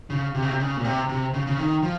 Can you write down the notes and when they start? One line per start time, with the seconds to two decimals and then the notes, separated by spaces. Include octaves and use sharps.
0.10 C#3
0.34 C3
0.42 C#3
0.49 C3
0.60 C#3
0.77 A#2
0.84 C3
1.09 C3
1.34 C#3
1.47 C#3
1.58 D#3
1.83 F3